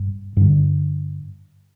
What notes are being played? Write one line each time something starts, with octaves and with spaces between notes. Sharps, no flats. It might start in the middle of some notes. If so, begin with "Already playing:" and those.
Already playing: G2
G2 D3